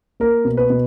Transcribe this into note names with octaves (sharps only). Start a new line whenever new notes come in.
A#3 A#4
B2
B4
B2